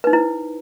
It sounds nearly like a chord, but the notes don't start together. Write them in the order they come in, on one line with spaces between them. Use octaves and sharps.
B4 D#4 C5 E4